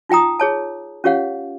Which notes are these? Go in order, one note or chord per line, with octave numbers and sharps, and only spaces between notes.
D#4 F4 G5 A#5 D#6
G#4 C#5 A5
C#4 F4 G4 C#5 F5 F#5